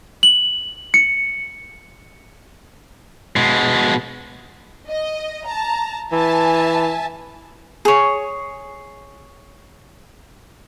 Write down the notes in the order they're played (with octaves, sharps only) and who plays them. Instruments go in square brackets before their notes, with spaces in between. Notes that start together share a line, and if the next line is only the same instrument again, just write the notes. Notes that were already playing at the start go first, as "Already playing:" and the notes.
[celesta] F#7
C#7
[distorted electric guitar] B2 G#3
[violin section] D#5
A5 A#5
[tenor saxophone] E3 [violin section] E5 G#5 A5
[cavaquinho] G#4 C#5